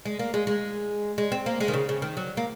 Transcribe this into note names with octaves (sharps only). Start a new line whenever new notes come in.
G#3
A#3
G#3
G#3
G#3
C4
A#3
G#3
D#3
C#3
C#3
D#3
F#3
A#3